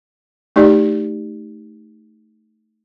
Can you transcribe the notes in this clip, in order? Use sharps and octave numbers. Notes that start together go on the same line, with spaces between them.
A3 D#4 G4 D5